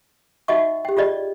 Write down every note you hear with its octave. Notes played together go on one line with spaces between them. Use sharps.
D#4 F#4 D#5 E5 F#5 C#6
G4 G5
F4 G4 G#4 D5 D#5